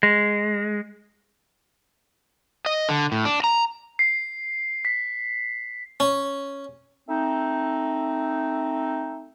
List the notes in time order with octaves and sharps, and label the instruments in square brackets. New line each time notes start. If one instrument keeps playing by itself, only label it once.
[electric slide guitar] G#3
D#5
D3
A2
D4
A#5
[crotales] C7
B6
[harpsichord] C#4
[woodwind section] A3 C4 D#4